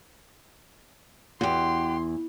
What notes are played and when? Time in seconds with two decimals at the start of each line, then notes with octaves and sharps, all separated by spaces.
1.41 E2 F#4 G4 C6